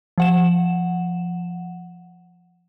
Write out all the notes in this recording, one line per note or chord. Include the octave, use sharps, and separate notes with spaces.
F3 F#5 E7